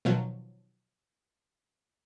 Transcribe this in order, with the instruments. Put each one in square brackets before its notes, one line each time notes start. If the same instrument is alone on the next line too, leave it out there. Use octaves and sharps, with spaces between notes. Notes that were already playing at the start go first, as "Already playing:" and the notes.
[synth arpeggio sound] B2 D#3 F3 F#3